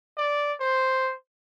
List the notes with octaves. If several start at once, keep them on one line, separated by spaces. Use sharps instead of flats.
D5
C5